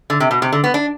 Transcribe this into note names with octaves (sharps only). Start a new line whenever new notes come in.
D3
C3
B2
C3
D3
B3
D4